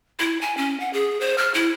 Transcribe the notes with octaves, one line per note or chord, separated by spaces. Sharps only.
E4
G#5
C#4
F#5
G#4
C5
F6
E4